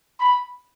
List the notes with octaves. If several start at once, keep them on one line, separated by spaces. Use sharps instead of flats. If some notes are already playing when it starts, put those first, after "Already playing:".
B5